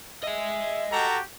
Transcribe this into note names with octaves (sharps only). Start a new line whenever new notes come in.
D#5 E5 G#5
F#4 G4 A4 A#5